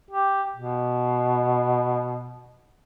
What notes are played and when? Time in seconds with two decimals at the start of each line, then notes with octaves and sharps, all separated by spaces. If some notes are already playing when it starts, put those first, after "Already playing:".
0.11 G4
0.56 B2